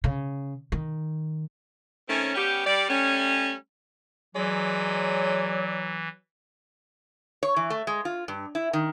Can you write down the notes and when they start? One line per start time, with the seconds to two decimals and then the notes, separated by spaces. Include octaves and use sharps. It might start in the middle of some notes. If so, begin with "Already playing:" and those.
0.04 C#3
0.72 D#3
2.09 D#3 A3 C4 C#4
2.35 G3 B3 C#4 G4
2.66 G3 D5
2.89 G3 A3 C#4
4.36 E3 F#3 G#3 D5
7.43 C#5
7.56 E3
7.70 A3
7.87 G#3
8.05 F4
8.28 G2
8.55 E4
8.73 D#3